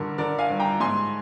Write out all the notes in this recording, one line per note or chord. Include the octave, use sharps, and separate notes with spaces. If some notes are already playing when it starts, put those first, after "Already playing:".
Already playing: G2 D3 A#4
D3 A#4 D5
F5 G#5
G2
G5 A#5
G#2 G#5 C6